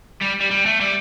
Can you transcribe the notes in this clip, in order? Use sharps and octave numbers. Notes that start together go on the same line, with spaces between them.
G3
G3
G3
A3
G3